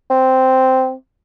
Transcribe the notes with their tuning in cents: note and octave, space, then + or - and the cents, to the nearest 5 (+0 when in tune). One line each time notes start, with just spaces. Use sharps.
C4 -5